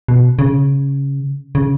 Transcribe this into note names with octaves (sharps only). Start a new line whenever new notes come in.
B2
C#3
C#3